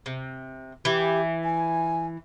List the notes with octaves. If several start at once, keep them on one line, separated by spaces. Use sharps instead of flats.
C3
E3 G4
G#5